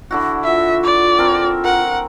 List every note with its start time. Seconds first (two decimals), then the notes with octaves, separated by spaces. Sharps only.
0.11 D3 E4 F#4
0.44 F4 E5
0.84 D5
1.18 C4 A4 A#4
1.64 A#4 F#5